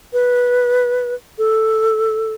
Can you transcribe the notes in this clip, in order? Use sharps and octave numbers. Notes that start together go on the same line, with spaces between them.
B4
A4